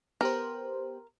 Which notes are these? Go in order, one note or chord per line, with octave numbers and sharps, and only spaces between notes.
B3 G4 A#4 C5